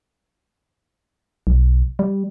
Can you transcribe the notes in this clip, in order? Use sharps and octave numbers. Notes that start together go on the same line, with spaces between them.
B1
G3